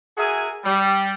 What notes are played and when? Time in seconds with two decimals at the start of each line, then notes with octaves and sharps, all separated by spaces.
0.18 F#4 G#4 A#4 E5 G#5
0.64 G3